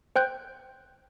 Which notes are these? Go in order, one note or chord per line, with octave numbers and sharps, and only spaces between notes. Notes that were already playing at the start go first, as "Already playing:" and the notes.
C5 G5 F#6 G6